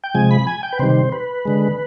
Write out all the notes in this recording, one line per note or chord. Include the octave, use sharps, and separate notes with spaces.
G5
C3 F3 G#3 G#5
B5
G#5
G5
B4
C3 D#3 G3 C5
B4
D3 G#3